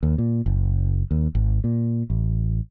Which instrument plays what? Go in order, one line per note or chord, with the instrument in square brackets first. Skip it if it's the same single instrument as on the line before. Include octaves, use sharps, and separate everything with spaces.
[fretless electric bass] D#2
A#2
F#1
D#2
G#1
A#2
A1